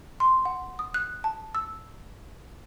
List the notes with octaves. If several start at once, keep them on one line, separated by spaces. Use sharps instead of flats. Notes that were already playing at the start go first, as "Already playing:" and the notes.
C6
F#5
D#6
F#6
A5
E6